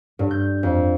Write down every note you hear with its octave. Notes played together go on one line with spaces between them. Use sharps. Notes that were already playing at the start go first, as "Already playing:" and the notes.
G2
G6
F2